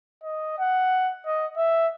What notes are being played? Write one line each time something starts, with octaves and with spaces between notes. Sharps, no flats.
D#5
F#5
D#5
E5